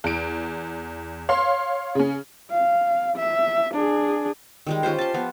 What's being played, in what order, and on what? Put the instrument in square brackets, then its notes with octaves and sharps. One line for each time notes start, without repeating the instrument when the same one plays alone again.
[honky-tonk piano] E2 D7
C#5 F5 C6
C#3 C#4
[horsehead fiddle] F5
E5
D4 G#4
[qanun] D#3 G3 G#3
C#4 F4 G4 C5
A5 C6
F3 B3